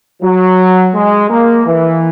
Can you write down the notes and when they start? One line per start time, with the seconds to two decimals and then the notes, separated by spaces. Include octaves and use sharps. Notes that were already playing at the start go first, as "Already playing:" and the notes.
0.22 F#3
0.95 G#3
1.30 A#3
1.66 E3